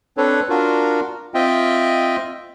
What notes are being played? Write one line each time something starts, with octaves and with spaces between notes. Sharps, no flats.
C4 D4 A4 B4 C#5
D4 F4 F#4 A#4
C4 F4 D#5 E5 G5